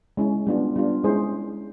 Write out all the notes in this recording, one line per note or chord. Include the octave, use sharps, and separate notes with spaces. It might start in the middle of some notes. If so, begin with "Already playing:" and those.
G#3 C#4 E4
G3 B3 D4 F4
G3 B3 D4 F4
G#3 C#4 E4 G#4 C5